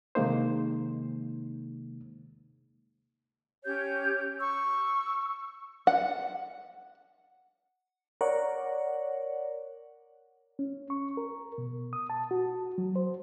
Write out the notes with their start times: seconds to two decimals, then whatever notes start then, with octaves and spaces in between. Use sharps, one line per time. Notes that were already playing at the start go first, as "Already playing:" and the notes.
0.15 C3 D#3 G#3 A#3 D#4 C5
3.65 C#4 G4 C#5 G6
4.40 C#6 E6
5.87 F#5
8.21 A#4 C#5 D5 F#5
10.59 C#4
10.90 C#6
11.17 A#4
11.58 B2
11.93 D#6
12.10 A5
12.31 F#4
12.78 F#3
12.96 C5